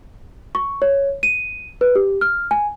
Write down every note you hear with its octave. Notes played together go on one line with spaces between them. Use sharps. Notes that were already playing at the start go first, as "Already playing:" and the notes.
C#6
C#5
D#7
B4
G4
F6
G#5